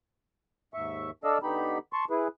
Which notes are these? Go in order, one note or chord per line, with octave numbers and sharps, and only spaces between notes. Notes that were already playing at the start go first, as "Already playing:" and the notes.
D#2 G#2 E5 C#6
D4 A4 D5 D#5 F5 E6
D3 B3 D#4 G4 B5
A5 C6 C#6
E4 G#4 B4